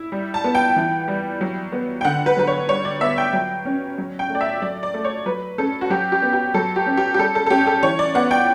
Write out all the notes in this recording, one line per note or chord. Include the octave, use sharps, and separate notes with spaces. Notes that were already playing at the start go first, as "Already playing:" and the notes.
Already playing: E4
G3
A5
B3
G5
E3
G3
F#3
B3
G5
D3 F#5
B4
F#3 B4
C#5
G3 C#5
D5
B3 E5
G5
F#3
C#4
F#3
G5
A3
D5
E5
F#3 D5
D5
A3
C#5
F#3 B4
C#4 A4
F#4
F#3 G4
G4
B3
G4
F#3 A4
G4
C#4
G4
G4
G3 A4
A4
A4
C#4 G4
A4
E3 C#5
D5
B3 F#5
G5